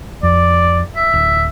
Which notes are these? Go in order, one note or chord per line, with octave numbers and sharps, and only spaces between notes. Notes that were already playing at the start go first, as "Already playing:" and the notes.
F2 D5
E5
D1